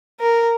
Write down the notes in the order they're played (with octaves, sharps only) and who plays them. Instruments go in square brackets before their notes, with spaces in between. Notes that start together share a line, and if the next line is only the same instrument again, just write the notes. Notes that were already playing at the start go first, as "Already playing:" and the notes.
[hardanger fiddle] A#4